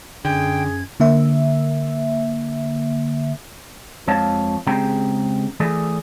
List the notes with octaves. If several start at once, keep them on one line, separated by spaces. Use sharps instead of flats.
F#2 D3 C#4 G#4 G5 G#6
D3 A#3 E5
F2 G#3 C#5 F5 A5
C#3 G#3 C4 G4 G5 A#5
E3 A3 G#4 D5